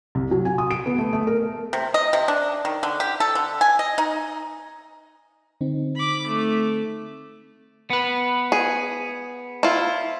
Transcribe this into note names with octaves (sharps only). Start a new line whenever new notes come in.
C2
F#3
G#5
D#6
D7
B3
A3
A3
A#4
C3
D#5
C3
D4
D#3
D3
G4
A4
D3
G#5
D#5
D#4
D3 C4 D#4
B5 D6
A3
B3 B4
G#4
E4 F4